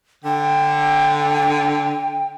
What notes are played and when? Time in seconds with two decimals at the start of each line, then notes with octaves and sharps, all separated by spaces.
0.24 D3 G5